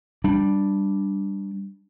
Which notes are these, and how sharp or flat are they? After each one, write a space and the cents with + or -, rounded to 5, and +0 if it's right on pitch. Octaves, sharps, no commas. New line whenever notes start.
G3 +0 D4 +0